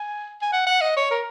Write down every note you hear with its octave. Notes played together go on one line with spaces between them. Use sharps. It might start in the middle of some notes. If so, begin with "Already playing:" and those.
Already playing: G#5
G#5
F#5
F#5
D#5
C#5
A#4